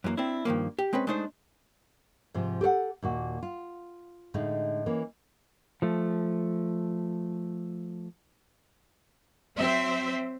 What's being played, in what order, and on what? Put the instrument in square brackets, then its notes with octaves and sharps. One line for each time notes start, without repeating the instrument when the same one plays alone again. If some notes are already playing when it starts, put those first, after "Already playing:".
[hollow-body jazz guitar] F#2 E3 G3 A#3
C4 D4 E4
G2 D#3 F3 A#3
G4
G#3 C4 C#4 B4
G#3 A3 D4 D#4 C5
[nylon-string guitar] G#2 C3 F3
G4 A4 C5 F#5
D#2 A#2 F#4
F4
A2 D3 G#3 D#4
E3 A#3 C#4
[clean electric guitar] F3 A3
[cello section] F#3 C4 C5 E5